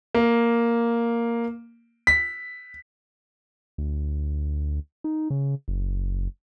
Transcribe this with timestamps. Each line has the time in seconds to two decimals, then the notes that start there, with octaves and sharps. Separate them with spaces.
0.15 A#3
2.07 B6
3.78 D2
5.04 D#4
5.30 C#3
5.68 F#1